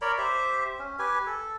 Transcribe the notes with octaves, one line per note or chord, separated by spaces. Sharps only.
A#4 C#5 D5 B5
G4 C5 E5
C#4
G4 B4 G#5
A4